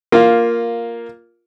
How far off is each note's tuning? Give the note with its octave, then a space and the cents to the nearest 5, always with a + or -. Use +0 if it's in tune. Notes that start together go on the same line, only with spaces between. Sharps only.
A#3 +0 F4 +0